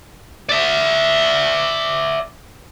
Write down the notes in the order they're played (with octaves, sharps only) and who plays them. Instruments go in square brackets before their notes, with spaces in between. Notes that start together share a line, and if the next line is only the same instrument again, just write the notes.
[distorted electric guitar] D5 E5